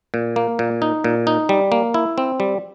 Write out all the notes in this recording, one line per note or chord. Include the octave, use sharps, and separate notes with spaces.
A#2
A#3
A#2
D#4
A#2
D#4
G3
A#3
E4
C4
G3